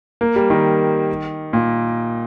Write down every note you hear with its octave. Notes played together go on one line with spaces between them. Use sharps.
A#3
G3
D#3
A#2